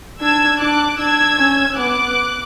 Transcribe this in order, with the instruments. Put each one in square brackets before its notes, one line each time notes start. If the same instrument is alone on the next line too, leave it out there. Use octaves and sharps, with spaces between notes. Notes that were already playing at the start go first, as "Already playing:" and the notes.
[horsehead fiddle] D4 [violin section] E6 G#6
[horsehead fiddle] D4 [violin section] D6 F#6
[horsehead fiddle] D4 [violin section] E6 G#6
[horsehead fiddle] C#4
[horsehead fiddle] B3 [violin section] D6 F#6